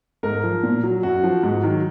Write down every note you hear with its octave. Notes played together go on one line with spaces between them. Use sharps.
G#2 A#4
F3
A#2
F#3
F#2 F#4
F3
G#2
D#3 F#3